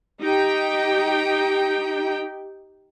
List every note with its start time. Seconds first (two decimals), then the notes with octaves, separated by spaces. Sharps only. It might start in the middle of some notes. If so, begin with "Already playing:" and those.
0.21 D#4 G4 G5